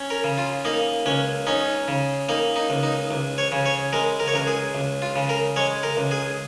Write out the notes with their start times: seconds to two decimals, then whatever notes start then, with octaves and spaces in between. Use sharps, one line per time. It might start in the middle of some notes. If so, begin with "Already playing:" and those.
Already playing: C#4
0.10 A#4
0.24 C#3
0.38 F4
0.65 A#3 D#4
1.06 C#2 C#4
1.47 C#4 D#4
1.88 C#3
2.29 A#3 D#4
2.56 D#4
2.70 C#2
2.83 D#4
3.11 C#2
3.38 C#5
3.52 C#3
3.66 C#5
3.93 G#3 A#4
4.20 A#4
4.28 C#5
4.34 C#2 A#4
4.47 G#4
4.75 C#2
5.02 F4
5.16 C#3
5.29 A#4
5.56 G#3 C#5
5.83 A#4
5.97 C#2
6.11 G#4